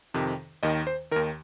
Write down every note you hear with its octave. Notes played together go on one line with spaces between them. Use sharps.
F2 C3 D#3
D#2 D#3 D#5
C5
D#2 D#3 A#4